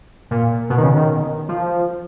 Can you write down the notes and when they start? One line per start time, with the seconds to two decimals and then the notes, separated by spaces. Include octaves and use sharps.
0.31 A#2
0.70 B2
0.78 D#3
0.83 C#3
0.96 D#3
1.49 F3